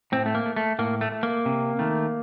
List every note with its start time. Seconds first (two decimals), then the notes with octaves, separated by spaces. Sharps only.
0.12 A2 C4
0.26 A3
0.35 A#3
0.46 A3
0.56 A3
0.79 A2 A#3
1.01 A3
1.12 A3
1.23 A#3
1.46 C3
1.79 D#3 A3